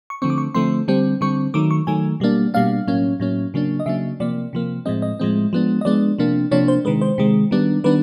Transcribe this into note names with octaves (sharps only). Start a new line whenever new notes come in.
C#6
D3 F3 A3 C4 C#6
D6
C#6
D3 F3 A3 C4 C6
D3 G3 C4
D3 G3 C4 C#6
D#3 F#3 A3 D6
C#6
D#3 F#3 A3 G#5
B2 G3 A#3 D4
B2 G3 A#3 D4 F5
A2 F#3 A#3 C#4
A2 F#3 A#3 C#4
C#3 F#3 A#3 D4
D#5
C#3 F#3 A#3 D4 E5
C3 F3 A#3 D5
C3 F3 A#3
A2 F3 G#3 C4 D#5
D#5
A2 F3 G#3 C4
F3 G#3 B3 D4
D#5
F3 G#3 B3 D4 D5
C3 F3 A#3 D4
C3 F3 A#3 D4 C#5
C5
C3 D#3 G#3 B4
C5
C3 D#3 G#3
D#3 G3 B3 D4
D#3 G3 B3 D4 B4